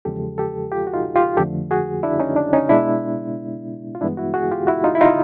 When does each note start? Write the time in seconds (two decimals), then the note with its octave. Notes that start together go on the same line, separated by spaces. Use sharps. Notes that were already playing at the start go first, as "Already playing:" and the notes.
0.05 E2 C#3 F3 G#3 G4 A4
0.38 G4 A4
0.71 F4 G4
0.87 F#4
0.93 D#4 F4
1.16 F4 G4
1.37 F2 D3 F3 A3 G4 A4
1.71 F#4 G#4
2.03 D4 E4
2.19 C#4 D#4
2.36 D4
2.53 C#4 D#4
2.69 B2 G#3 B3 D4 E4
3.95 F4
4.01 G2 E3 G#3 B3 D4 E4
4.17 E4 F#4
4.34 F#4 G#4
4.52 F4 G4
4.67 E4 F#4
4.84 D#4 F4
4.95 E4
5.01 D#4 F4